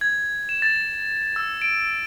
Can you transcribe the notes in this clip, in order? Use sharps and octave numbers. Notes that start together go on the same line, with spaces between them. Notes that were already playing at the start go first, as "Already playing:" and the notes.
G#6
E7
A6
E6
D7